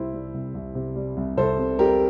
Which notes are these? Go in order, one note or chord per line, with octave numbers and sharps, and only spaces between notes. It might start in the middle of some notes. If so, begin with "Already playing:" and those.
Already playing: C2 C3 C4 E4
G3
C2
C2
C3
G3
C2
C2 A4 C5
C3
G3 G4 A#4